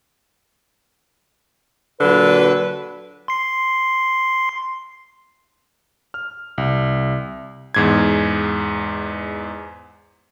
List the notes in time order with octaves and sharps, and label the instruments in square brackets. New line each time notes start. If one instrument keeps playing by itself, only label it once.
[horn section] A#2 D3 F#3 [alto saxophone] B4
[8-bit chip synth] C6 C7
[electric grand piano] F6
C2
E2 G#2 G#6